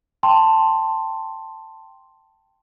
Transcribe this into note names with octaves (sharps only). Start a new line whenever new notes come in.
G5 A5 C6